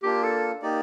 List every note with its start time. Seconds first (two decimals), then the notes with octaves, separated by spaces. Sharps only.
0.03 A#3 D4 F4 G4
0.24 A4
0.62 A#3 D#4 G4 D5